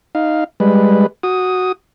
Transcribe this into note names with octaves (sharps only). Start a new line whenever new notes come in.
D#4 F5
G3 G#3 B4
F#4 D#6